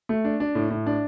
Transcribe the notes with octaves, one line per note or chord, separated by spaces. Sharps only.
A3
D4
D4
A2
A2
D4